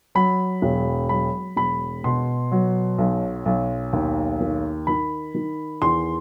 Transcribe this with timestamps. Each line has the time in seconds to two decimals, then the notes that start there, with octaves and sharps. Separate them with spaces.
0.15 F#3 B5
0.62 E1
1.09 F#3 B5
1.56 E1 B5
2.04 B2 C6
2.52 F#3
2.98 B1
3.46 B1
3.93 D#2
4.40 D#3
4.87 D#3 B5
5.35 D#3
5.82 E2 C6